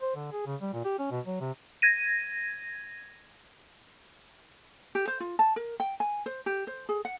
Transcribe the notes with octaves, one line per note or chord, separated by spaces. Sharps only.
C5
D3
G#4
C#3
G3
A#2
G4
C#4
B2
F#3
C3
G#6 A#6 D#7
G4
C5
F4
A5
A#4
G5
G#5
C5
G4
C5
G#4
F#5